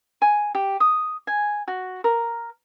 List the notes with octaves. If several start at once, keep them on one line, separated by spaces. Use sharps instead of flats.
G#5
G4
D#6
G#5
F#4
A#4